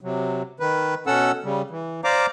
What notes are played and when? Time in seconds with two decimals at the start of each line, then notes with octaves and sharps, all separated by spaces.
0.01 C3 F#3
0.60 D#3 B4
1.07 B2 C#4 A4 F#5 E6
1.44 C#3 G3
1.70 E3
2.04 C5 D5 F5 A#5 D6